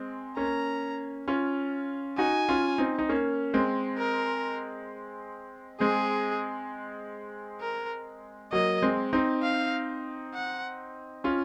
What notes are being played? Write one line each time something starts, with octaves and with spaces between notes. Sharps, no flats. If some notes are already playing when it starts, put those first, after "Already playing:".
Already playing: G#3 C4
A#3 C#4 A#5
C#4 F4
D#4 F#4 G#5
C#4 F4
C4 D#4
D#4
A#3 C#4
G#3 C4
A#4
G#3 C4 G#4
A#4
F#3 A#3 D#5
G#3 C4
C4 D#4
F5
F#5
C#4 F4